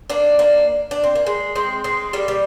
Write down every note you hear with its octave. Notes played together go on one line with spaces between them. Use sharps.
A#3 D4
A#3 D4
D4
C4
A#3
G#3
G#3 C4
G#3 C4
G3 A#3
G3